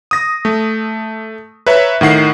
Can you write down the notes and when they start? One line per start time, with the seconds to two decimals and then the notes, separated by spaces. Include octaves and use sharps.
0.11 D#6 A#6
0.45 A3
1.67 B4 C#5 E5 A#5
2.01 A2 D#3 F#5 C7